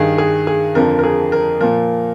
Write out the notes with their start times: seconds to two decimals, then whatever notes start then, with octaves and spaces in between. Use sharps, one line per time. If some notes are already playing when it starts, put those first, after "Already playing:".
Already playing: G2 D#3 G#4
0.18 G#4
0.47 G#4
0.75 F2 D3 F3 A#4
0.99 A#4
1.04 G#4
1.32 A#4
1.61 A#2 F3 A#4